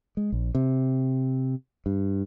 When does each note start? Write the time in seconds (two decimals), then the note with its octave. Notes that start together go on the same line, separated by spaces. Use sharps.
0.17 G#3
0.32 A#1
0.55 C3
1.86 G2